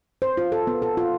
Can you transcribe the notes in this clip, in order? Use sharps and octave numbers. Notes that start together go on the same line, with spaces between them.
C5
F4
A4
B3
A4
F4